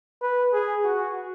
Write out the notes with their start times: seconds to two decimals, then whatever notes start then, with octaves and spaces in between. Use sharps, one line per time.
0.22 B4
0.53 G#4
0.85 F#4